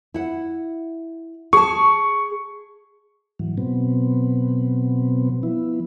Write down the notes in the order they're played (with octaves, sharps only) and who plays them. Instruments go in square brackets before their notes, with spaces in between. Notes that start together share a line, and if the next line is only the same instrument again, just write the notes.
[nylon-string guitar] E4 F#5
[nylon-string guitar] G#4 A5 [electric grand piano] C#6
[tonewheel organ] G#2 E3 F#3
B2 F#3 B3 C4
F3 B3 E4